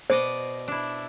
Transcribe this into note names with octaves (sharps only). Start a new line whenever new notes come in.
B2 C5 D5 D#5
D4 E4